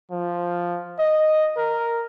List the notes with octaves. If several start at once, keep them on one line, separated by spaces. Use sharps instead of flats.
F3
D#5
A#4